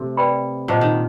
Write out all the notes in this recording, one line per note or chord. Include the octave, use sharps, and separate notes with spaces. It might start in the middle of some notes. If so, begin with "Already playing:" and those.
Already playing: C3 A3
B4 D5 G5 B5
A#2 C5 D#5 F#5 A5
D#3